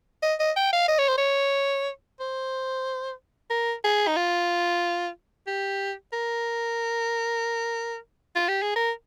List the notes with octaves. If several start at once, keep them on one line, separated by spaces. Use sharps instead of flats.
D#5
D#5
G5
F5
D#5
C#5
C5
C#5
C5
A#4
G#4
D#4
F4
G4
A#4
F4
G4
G#4
A#4